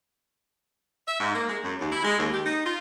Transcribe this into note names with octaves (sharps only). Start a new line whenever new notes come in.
E5
G#2
A#3
G#3
F#2
D#2
E4
G#3
D#2
G4
D#4
F4